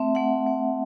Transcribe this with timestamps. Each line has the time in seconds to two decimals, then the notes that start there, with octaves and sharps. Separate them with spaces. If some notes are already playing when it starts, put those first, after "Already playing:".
Already playing: A3 C4 E5
0.15 A3 F#5
0.47 A3